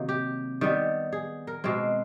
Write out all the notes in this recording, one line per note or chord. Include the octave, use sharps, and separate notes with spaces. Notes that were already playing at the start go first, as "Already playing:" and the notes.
Already playing: C3 D#3 F#3 A#3
G4
D#3 G3 B3
G#4
A#4
B2 G#3 C4